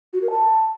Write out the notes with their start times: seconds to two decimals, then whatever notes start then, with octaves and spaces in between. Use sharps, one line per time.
0.13 F#4
0.22 A#4
0.31 A5